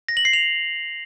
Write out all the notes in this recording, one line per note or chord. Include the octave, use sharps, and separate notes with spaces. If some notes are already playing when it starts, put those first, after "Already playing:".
A#6
F#7
C7
F7